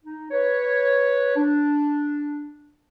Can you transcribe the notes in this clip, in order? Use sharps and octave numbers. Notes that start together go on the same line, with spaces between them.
D#4
B4 C#5
D4